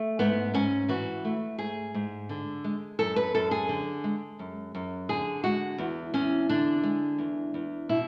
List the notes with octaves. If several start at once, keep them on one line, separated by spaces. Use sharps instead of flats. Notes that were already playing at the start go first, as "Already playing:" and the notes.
Already playing: A3
G#2 B3
G#2 C#4
E3 F#4
A3
G#2 G#4
G#2
D3
G#3
F#2 A4
B4
F#2 A4
G#4
D3
G#3
F#2
F#2
D3 G#4
G#3 F#4
E2
E2 C#4
D3 D4
G#3
E2
E2
B2 E4